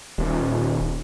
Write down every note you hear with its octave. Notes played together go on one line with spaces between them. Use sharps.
D#1